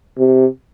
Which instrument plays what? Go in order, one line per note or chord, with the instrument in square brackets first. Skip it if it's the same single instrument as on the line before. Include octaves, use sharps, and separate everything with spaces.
[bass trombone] C3